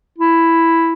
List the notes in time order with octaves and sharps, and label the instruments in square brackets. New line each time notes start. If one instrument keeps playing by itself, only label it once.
[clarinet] E4